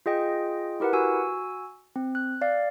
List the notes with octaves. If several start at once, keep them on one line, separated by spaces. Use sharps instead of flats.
F4 G#4 D#5 G5
E4 G4 A#4 B4 F#5
F#4 G#5 E6
C4
F#6
D5 F5